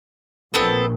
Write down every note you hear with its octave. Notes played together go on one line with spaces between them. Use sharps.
A#1 B3 C4 A4